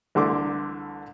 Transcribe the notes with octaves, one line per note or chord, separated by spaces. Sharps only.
C2 D3 E3 A3 C6 D6